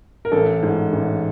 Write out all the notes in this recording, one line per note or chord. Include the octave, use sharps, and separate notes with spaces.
A#4
A1 A4
G#2
A1